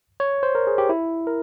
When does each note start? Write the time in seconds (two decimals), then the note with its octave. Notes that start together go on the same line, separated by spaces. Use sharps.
0.20 C#5
0.43 C5
0.55 A#4
0.67 G#4
0.78 G4
0.89 E4
1.27 A#4